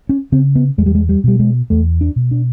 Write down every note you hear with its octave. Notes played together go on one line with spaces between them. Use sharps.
C#4
C#3 C4
B3
E2 G#3
G3
G#3
G3
B2 G3
G#3
E2 A3
D4
B2
D4